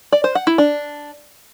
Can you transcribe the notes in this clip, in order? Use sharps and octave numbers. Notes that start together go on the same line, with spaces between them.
D5
C5
F#5
E4
D4